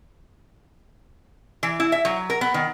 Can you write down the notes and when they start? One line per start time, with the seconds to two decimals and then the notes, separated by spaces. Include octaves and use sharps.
1.63 E3
1.80 E4
1.92 E5
2.05 F#3
2.30 A#4
2.41 B3
2.54 D#3